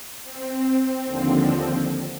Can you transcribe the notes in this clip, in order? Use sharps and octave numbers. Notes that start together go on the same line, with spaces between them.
C4
D#2 D3 F3